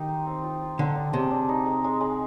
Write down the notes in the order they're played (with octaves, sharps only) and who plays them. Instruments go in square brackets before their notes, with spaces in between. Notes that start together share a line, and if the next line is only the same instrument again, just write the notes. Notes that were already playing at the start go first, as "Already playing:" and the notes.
Already playing: [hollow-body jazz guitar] D#3 [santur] D#4 G4
[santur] C5
C4
F4
F4
[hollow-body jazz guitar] D3 [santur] D4
[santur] D4
[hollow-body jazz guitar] C3 [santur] G#3
[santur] D4
D#4
G#3
G#3
G#3